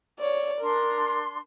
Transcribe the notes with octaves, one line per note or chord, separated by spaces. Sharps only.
C#5 D5
D4 A#4 C6